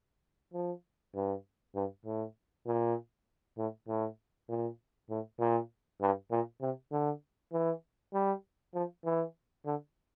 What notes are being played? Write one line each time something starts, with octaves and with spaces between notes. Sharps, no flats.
F3
G2
G2
A2
A#2
A2
A2
A#2
A2
A#2
G2
A#2
C3
D3
E3
G3
F3
E3
D3